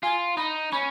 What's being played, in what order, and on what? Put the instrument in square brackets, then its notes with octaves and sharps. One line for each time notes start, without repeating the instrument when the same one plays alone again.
[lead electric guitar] F4 [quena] G#5
[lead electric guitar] D#4 [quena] B5
[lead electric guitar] C#4 [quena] B5